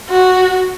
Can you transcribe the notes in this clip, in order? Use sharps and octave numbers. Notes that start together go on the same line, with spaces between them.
F#4